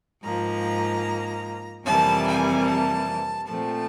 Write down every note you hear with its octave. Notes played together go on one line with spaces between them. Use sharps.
G#2 F3 A#3 A#5
F2 C3 E3 G3 A#3 A5
G#5
A5
A#2 F3 A3 C4 A5